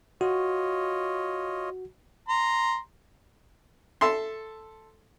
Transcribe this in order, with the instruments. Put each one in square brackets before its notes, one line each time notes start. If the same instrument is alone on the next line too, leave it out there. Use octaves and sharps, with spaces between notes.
[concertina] F4 C#5 D#5 [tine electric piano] F#4
[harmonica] A#5 C6
[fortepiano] A4 E5 C6